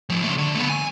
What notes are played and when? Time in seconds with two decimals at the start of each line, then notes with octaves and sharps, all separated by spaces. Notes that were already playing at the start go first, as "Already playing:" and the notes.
0.10 A2 F3
0.24 C#3 A3
0.38 D3
0.55 A3 B3
0.69 G#5